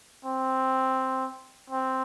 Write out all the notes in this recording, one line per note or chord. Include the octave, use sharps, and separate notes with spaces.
C4
C4